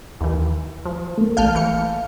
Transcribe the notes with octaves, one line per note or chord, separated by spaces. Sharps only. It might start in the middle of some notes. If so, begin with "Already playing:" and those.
D#2 E3
F3
A3 A#3
A1 F5 A5 F6 G6
E3 C#7